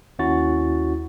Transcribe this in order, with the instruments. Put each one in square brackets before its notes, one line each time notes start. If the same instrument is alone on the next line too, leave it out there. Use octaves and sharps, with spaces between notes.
[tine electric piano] D#2 C#4 E4 F#4 A6